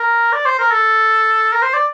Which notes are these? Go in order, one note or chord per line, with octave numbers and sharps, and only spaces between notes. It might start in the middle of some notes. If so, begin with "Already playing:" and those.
Already playing: A#4
D5
C5
A#4
A4
A#4
C5
D5